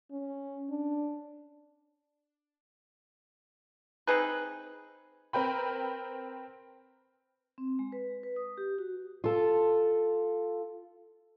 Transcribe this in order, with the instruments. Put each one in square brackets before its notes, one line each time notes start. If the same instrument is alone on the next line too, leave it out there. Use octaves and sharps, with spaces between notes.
[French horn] C#4
D4
[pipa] C4 D#4 G#4 B4
[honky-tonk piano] C4 A#4 B4 G5 B5
[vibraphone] C4
G#3
B4
B4
D#6
G4
F#4
[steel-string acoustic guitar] F4 A4